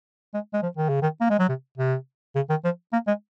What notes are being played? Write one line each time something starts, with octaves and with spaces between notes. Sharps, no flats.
G#3
G#3
F3
D#3
C#3
D#3
A#3
G#3
F#3
C3
C3
C#3
D#3
F3
A#3
G#3